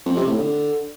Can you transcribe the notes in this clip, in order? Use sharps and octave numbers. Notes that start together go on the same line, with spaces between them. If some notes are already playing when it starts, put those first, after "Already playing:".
F2
C3
A2
D3